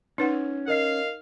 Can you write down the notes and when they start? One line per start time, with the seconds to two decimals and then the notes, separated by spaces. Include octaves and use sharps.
0.18 C#4 D#4 B4 F#5
0.68 A#4 D#5 F5 C7